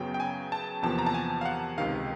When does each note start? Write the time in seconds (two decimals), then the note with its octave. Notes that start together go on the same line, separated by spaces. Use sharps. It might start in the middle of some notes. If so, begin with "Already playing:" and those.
Already playing: F#2 C#3 F#3 B3 G5
0.14 G5
0.20 G#5
0.52 A5
0.83 E2 C3 F3 A#3 A5
0.99 A#5
1.06 A5
1.14 G#5
1.41 F5
1.45 F#5
1.78 C#2 C3 D#3 F5